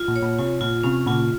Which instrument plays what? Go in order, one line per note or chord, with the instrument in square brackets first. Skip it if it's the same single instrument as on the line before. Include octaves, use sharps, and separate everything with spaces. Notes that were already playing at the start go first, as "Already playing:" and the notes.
Already playing: [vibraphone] F4
[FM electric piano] A#2
[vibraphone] C#5
[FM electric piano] A#2
[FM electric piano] C3 [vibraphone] F4
[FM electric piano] A#2 [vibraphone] F4
[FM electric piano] C3 [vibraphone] C#4
[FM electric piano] A#2 C#3 [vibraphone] F4